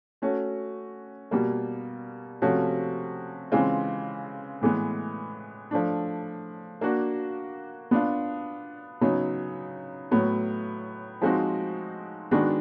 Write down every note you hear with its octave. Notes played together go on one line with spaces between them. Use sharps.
A3 C#4 F#4
B2 G3 A#3
C3 F3 A3 C#4 F#4
C#3 E3 G#3 C4 F4
A2 E3 G#3 B3
F3 A3 D4
A#3 D4 F#4
B3 D4 F4
C#3 F#3 B3 D#4
A2 F#3 B3
F3 G#3 C4 D#4 F#4
D#3 G#3 B3 D4 F#4